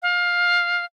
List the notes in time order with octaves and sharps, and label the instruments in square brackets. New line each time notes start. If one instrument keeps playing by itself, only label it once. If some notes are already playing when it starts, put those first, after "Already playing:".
[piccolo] F5